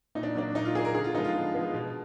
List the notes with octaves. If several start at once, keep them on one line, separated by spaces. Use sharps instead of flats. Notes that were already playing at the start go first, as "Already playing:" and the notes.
A#2 D#4
D4
F#3 A#3 D4
A#2 D#4
F4
F#3 A#3 G#4
A#4
D3 G#4
F4
F3 G#3 B3 D#4
F4
D3
F3 G#3 B3
B2